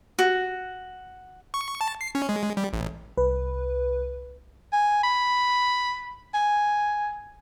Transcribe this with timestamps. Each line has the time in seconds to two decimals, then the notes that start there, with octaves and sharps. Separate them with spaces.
0.19 F#4
1.54 C#6
1.81 A5
2.01 C7
2.15 C#4
2.29 G#3
2.57 G3
2.73 A1
3.17 C2 B4
4.72 G#5
5.03 B5
6.34 G#5